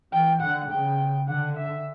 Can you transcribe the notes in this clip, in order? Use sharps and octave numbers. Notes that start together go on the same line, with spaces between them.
E3 G5
D3 F#5
C#3 G5
D3 F#5
E5